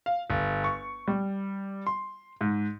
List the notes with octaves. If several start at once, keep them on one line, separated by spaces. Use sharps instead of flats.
F5
G1
C#6
G3
C6
G#2